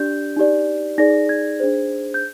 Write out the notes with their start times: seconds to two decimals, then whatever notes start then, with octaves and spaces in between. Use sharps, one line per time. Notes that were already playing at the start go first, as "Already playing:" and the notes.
Already playing: D4 G4 D5 G6
0.37 D#4 G4 D5
0.98 D#4 G#4 D5 A#6
1.29 G#6
1.60 D4 G#4 C5
2.14 G6